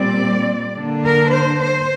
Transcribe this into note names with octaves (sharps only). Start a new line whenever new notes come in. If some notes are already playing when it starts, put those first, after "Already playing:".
Already playing: A#2 G3 C4 D5
D3 A#3 D4
A#4
C5
C5